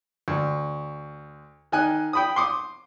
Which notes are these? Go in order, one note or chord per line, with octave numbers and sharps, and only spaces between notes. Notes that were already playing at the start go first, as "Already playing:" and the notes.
D2
D#3 G#5 F#6
G5 B5 D#6
C6 D6 D#6